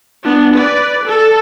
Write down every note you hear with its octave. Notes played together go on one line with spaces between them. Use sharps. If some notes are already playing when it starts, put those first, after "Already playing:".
B3 D4
B4 D5
A4